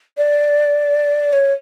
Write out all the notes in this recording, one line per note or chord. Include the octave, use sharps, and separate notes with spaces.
D5
C#5